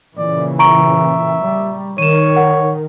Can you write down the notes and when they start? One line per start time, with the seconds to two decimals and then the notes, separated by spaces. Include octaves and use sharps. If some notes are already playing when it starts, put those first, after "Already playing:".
0.18 A#2 C#3 E3 D5
0.59 E5 A#5 C#6 D7
1.45 G3
1.98 D#3 C#5 D#7 E7
2.36 F#5